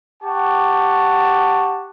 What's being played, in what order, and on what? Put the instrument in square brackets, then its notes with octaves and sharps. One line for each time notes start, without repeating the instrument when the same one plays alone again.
[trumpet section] G4 F#5 A5 C#6